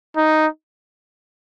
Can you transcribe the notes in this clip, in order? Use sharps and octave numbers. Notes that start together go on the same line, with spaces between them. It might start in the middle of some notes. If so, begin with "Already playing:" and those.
D#4